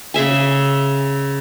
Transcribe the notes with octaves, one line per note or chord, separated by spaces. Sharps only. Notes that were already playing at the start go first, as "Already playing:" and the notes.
C#3 G#4 E5 G#5